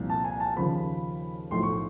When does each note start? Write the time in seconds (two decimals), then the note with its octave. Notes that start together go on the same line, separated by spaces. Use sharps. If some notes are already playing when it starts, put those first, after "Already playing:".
Already playing: C2 A#2 F3
0.10 A5
0.24 G#5
0.40 A5
0.56 D#2 C#3 F3 B5
1.51 B1 A2 F3 C6
1.63 C#6